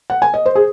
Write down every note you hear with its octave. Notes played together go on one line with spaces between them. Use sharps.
F#5
G#5
D#5
C5
G#4